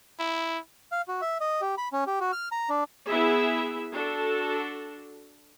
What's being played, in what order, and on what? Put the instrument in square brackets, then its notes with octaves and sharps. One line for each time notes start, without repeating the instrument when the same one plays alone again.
[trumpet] E4
[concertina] F5
F#4
E5
D#5
G4
B5
C#4
G4
F#4
F6
A#5
D4
[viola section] B3 E4 G#4 E5
D4 F#4 A4